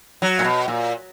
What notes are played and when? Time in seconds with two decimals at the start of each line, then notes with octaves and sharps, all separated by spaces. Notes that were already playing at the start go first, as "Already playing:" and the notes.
0.22 F#3
0.39 A#2
0.44 B2
0.68 A#2